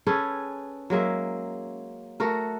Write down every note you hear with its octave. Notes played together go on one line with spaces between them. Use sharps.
C#4 G#4 A4 B4
F#3 G#3 A#3 E5
A3 F#4 A#4